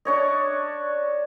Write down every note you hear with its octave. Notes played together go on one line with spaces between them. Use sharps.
D4 C#5 D#5